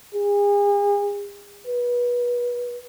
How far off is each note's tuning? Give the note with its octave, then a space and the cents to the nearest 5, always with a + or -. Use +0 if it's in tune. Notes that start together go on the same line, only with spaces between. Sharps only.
G#4 -40
B4 -25